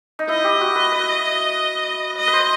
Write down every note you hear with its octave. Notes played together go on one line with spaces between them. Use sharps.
D#4
E4 D#5
G4
F#4
B4
B4
D#5
B4
C5